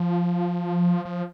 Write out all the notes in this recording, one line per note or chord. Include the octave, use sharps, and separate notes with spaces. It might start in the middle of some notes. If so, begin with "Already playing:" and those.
Already playing: F3
F3